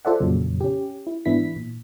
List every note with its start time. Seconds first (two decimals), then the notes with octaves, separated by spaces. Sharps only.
0.05 F4 A4 C5 D5 E5 F#5
0.20 F2 A#2 C#3 F#3
0.61 C#4 G4
1.07 E4
1.25 G#2 E3 B3 D4 E4 B6
1.56 A#2